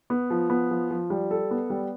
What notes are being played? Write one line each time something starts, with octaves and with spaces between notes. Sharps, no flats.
B3
F3
B3
F3
F3
G3
A4
B3
G3